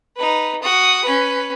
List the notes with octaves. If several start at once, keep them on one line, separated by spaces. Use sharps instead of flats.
D#4 B4
F#4 D#6
C#4 B4